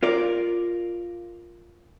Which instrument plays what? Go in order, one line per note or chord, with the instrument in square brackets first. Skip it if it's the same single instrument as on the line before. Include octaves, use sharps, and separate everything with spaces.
[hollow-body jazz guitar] F4 A#4 D5